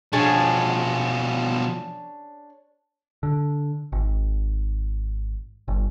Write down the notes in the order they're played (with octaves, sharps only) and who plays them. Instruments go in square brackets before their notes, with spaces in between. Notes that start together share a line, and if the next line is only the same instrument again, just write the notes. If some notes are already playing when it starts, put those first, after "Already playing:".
[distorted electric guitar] B2 F3 [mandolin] C#4 D4 G#4
[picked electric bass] D3
G#1
G1